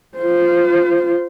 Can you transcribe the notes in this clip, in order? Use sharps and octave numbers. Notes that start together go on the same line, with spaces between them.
F4 C5